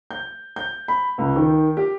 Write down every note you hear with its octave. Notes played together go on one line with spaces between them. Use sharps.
G6
G6
B5
C#2
D#3
G4